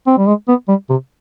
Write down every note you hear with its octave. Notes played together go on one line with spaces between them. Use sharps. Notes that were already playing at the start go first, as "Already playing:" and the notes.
C4
G3
G#3
B3
G3
C3